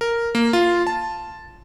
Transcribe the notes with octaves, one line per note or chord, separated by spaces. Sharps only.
A#4
A#3
F4
A5